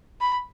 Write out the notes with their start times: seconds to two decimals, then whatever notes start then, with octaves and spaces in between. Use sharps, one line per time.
0.21 B5